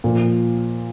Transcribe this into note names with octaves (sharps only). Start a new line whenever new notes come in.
A#2 F3